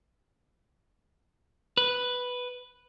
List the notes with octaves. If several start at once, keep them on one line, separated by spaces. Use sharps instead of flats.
B4